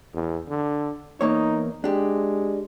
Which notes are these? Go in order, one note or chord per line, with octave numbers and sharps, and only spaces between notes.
E2
D3
E2 A#3 D#4 C#5
G#3 D4 G4